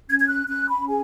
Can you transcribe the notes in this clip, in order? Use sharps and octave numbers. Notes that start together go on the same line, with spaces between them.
C#4 G#6
G#6
F#6
C#4 F#6
B5
G#4 G#5